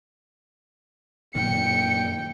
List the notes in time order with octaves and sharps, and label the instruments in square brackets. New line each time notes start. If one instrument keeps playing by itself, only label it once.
[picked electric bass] F#2 A#2 D#3 [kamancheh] G5 [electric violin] C#7